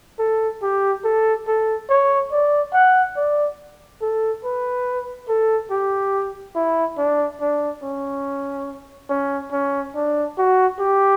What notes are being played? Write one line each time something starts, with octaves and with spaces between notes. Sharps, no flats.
A4
G4
A4
A4
C#5
D5
F#5
D5
A4
B4
A4
G4
E4
D4
D4
C#4
C#4
C#4
D4
F#4
G4